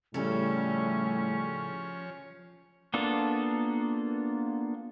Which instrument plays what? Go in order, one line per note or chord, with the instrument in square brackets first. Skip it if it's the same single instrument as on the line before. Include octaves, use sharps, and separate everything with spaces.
[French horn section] A2 G3 [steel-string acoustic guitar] C#3 A4 [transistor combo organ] F3 C#5 [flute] C#4
[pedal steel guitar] A#3 B3 D4 F4 A4